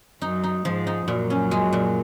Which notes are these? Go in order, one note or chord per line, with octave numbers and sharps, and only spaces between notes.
F#2 F#3 D#4
D#4
G#2 F3 G#3
D#4
F#2 A#2 F#3
C#4
G#3
A#2